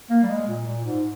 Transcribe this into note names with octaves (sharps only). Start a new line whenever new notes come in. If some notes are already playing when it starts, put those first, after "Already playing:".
A#3
G3
G#3
A#2
A#2
G#2